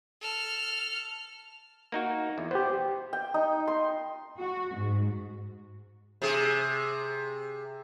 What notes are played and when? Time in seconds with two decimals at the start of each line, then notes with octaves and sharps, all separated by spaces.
0.21 A4 F6
1.92 A#3 D#4 F#4
2.38 E2
2.51 B3 G4 C5
3.13 G5
3.34 D#4
3.68 C6
4.40 F#4
4.76 G#2
6.22 C3 G#4